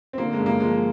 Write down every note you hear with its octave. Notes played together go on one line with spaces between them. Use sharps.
C4
D3 A#3
G#3
G2
A#3
F3 G#3